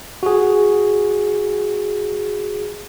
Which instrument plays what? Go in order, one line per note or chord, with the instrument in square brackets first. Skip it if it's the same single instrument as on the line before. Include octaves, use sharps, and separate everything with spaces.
[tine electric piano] F#4 G#4